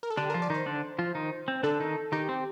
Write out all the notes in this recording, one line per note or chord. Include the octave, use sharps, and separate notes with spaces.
A#4
A4
D3 D4 G4
F3 F4 A#4
D5
D#3 D#4 C5
D3 D4
F3 F4
D#3 D#4
C4
D3 D4 A4
D#3 D#4
D#3 D#4 G4
C4